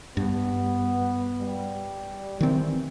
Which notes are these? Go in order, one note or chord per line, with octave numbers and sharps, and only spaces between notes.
G2 B3
G3
D#3 E3 C4